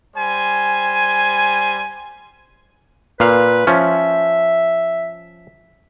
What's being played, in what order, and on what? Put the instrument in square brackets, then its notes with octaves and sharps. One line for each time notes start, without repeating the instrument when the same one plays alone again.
[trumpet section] G3 C5 G#5
[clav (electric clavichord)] A#2 F5 [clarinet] B4
[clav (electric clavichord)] F3 C#4 [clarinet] E5